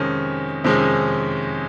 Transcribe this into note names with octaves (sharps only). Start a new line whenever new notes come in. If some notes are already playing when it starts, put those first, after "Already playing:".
Already playing: F2 C3 D#3 G#3 C#4
F2 C3 D#3 G#3 C#4